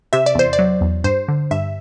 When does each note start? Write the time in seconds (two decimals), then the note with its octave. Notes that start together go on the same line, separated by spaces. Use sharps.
0.13 C3 E5
0.26 D5
0.35 E2 C5
0.53 D5
0.59 F#3
0.81 E2
1.04 G2 C5
1.28 D3
1.51 G2 E5